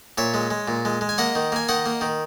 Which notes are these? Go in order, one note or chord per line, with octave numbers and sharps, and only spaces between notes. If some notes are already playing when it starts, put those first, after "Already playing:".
A#2 C#5 E5
G#3
G#3
A#2
G#3
G#3
G#5
A#3 D#5 F#5
D#3
A#3 G#5
D#3 D#5 F#5
A#3
D#3